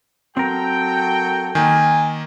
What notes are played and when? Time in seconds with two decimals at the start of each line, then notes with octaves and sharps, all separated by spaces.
0.37 F#3 C4 A4 A#4 G5
1.55 D#3 A#3 G#5